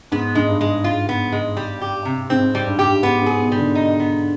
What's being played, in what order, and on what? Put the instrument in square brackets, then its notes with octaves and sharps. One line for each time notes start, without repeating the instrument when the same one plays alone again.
[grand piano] G#2 [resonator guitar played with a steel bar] B3
[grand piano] G#2 [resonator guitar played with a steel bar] G#3
[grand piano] G2
[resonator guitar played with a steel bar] G#3
F4
B3
G#3
G3
G4
C3
[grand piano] G#2 [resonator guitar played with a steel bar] C4
[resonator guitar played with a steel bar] G3
[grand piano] G2
[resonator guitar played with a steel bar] G4
[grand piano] G2
[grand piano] G#2 [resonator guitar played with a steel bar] B3
[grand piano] G#2
[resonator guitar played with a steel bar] G#4
[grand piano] B2
[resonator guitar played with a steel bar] G3
[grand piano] D3
[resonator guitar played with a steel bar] D#4
B3